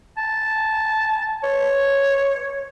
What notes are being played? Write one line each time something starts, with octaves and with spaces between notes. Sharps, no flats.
A5
C#5